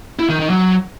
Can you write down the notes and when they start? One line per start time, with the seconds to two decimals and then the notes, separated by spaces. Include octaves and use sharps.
0.19 E4
0.29 D#3
0.39 D#3
0.50 F#3